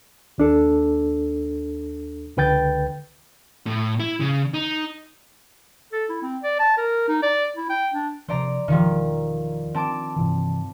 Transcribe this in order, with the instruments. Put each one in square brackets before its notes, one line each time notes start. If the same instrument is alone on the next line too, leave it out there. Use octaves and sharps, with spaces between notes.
[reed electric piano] D#2 D4 A4
C#2 D3 B4 G5 G6 A6
[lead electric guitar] A2
E4
C#3
D#4
[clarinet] A4
E4
C4
D5
A5
A#4
D#4
D5
E4
G5
D4
[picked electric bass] C3 F3 [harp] C5 D5 A#5
[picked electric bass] E1 [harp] D#3 F3 G3
[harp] C4 A5 D6
[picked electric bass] G2 C3 E3